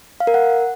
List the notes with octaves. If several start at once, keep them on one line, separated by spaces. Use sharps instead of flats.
F5
A#4
F#5